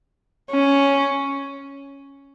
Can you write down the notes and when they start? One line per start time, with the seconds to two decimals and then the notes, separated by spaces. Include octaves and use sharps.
0.51 C#4